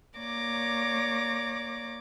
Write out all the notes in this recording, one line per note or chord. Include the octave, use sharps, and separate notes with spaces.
A#3 C#5 D5 D6 A#6